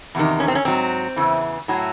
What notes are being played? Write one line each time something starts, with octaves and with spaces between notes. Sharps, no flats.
E2 C3 D#3
C#4
C4
C#4
G#2 F#3 C4
E2 C#3 E3
A2 F#3